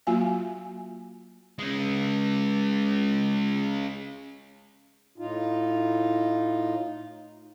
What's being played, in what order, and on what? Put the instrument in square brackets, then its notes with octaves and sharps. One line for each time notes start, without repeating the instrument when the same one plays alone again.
[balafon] F#3 A#3 F4 F#4 F5 G#5
[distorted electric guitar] G#3 C#4
[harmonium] A2 D#4 F4